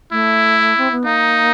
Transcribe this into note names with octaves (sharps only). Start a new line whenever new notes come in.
A3 E4
C4
B3
A#3 D#4